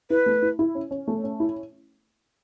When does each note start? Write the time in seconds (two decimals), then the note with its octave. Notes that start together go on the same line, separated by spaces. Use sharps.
0.10 E4 B4
0.26 A3
0.42 E4
0.59 E4
0.75 C#4
0.91 C#4
1.08 A3
1.24 C#4
1.40 E4